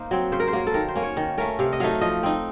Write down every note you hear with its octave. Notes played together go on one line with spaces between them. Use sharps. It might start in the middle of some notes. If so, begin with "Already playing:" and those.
Already playing: A#3 D#4 C5
F#3 C4
C#3 C5
A#4
C5
F#3 A#3
A4
D#3 A#4
C5
A#3 C#4
C#5
D#3
A3 C#4 A#4
C3 F5
D#5
F#3 A3 D#4 F5
F3 D#5
C4 D#4